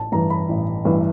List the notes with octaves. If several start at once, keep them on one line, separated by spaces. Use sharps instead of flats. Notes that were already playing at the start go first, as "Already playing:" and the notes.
Already playing: A1 A5
G2 E3 A#5
B5
A1
G2 E3